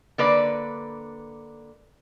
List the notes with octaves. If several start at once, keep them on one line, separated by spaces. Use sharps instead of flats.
D3 A#3 B4 D5